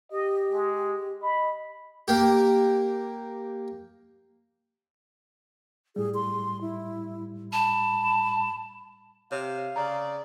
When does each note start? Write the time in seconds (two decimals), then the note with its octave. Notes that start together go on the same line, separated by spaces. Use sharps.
0.12 G4 D#5
0.51 G#3
1.21 D#5 B5
2.08 A#3 G4
5.96 A2 G3 G#4
6.15 C6
6.61 E4
7.53 A5 B5
9.32 C3 C#5 F5
9.76 C#3 D5 A#5